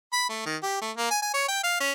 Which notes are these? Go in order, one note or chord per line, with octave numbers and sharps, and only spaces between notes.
B5
A3
D#3
G4
A3
A#3
G#5
G#5
C#5
G5
F5
C#4